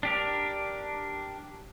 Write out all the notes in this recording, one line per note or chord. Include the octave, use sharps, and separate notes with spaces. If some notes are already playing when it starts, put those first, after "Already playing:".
D4 G4 A#4